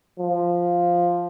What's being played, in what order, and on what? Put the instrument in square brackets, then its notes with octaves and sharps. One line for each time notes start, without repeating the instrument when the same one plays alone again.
[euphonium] F3